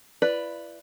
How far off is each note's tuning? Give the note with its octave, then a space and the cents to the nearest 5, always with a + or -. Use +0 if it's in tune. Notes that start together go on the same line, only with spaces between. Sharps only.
E4 +40 B4 +0 D5 +0